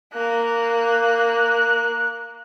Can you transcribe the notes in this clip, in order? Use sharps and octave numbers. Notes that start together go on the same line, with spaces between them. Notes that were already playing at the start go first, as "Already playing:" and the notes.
A#3 F#6